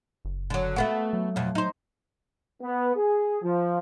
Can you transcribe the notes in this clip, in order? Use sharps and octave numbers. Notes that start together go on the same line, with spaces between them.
F#1
D3 F#3
A3 B3 F#4
F#3
F2 B2
D#4 C5
B3
G#4
F3